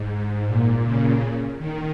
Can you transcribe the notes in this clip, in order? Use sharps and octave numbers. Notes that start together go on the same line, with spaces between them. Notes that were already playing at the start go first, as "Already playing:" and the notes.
Already playing: G#2
A#2
C#3
D#3